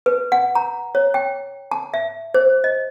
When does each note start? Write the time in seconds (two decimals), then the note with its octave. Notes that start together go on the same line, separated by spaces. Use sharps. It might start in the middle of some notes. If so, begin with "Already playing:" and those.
0.06 B4
0.32 F#5
0.55 A#5
0.95 C#5
1.14 G5
1.71 A5
1.94 E5
2.34 C5
2.64 D#5